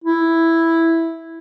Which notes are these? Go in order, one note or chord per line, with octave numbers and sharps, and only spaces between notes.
E4